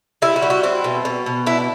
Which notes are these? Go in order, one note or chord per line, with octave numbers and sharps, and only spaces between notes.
G3 E4
F#4
G3
F#4
C4 E4
B2
B2
B2
D4 E4